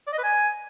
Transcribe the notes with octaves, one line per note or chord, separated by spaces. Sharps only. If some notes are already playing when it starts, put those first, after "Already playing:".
D5
D#5
B4
G#5